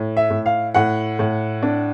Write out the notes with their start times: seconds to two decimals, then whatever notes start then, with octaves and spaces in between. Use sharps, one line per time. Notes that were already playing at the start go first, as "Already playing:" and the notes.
Already playing: A2
0.17 E5
0.30 A2
0.46 F5
0.74 A2 F#5
1.19 A2
1.63 D4